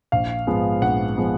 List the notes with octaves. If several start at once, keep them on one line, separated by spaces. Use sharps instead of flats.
A#1 F5
G#2 F3 G#3 B3
A#1 F#5
F3 G#3 B3